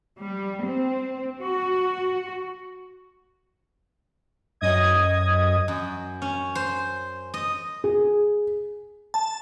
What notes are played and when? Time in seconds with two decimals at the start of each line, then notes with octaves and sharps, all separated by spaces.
0.19 G3
0.63 C4
1.41 F#4
4.61 F#2 D#5 D#6 G#6
5.68 F#2
6.22 C#4
6.55 C5
7.34 D#5
7.84 G#4
9.14 A5